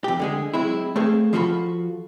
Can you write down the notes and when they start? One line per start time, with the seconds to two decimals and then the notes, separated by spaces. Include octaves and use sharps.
0.04 F2 G4
0.20 D3 G#3 G#4
0.54 F#3 G#3 C4 E4
0.96 A3 A#3 C4 G#4 A4
1.33 F3 F4 F#4 A4 G#5 B5